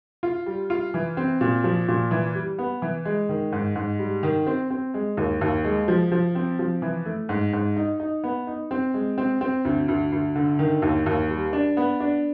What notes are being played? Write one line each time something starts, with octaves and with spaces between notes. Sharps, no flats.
F4
G3
F4
E3
C4
A#2
F3
A#2
E3
G3
B3
E3
G#3
D#3
G#2
G#2
G3
D#3
C4
C4
G#3
D#2
D#2
G#3
F3
F3
C4
F3
E3
A3
G#2
G#2
D#4
D#4
B3
D#4
C4
G#3
C4
C4
D2
D2
D2
D3
D#3
D#2
D#2
G3
D4
B3
D4